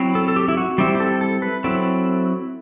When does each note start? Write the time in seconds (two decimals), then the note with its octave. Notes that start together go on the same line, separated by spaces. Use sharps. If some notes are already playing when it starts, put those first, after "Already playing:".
Already playing: F#3 C4 E4
0.15 A4
0.28 A4
0.36 G4
0.48 E4
0.57 F#4
0.78 G3 C4 E4 G4
0.95 G4
1.00 A4
1.21 A4
1.42 B4
1.64 F#3 C4 E4 A4